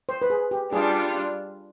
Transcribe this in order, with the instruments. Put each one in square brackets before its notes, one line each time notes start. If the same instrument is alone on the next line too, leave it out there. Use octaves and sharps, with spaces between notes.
[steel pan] C5
B4
G#4
G4
[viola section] G3 D4 F4 [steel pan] G#4